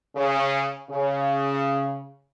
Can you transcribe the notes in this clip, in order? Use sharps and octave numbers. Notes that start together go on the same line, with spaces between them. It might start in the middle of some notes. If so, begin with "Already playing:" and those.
C#3
C#3